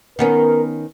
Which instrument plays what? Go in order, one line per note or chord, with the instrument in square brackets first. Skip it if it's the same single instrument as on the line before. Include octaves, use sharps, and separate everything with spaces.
[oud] D#3 B3 C#4 [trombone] A#4